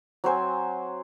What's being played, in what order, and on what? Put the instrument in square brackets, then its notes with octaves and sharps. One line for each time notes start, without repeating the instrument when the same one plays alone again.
[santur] F#3 C4 C5 G#5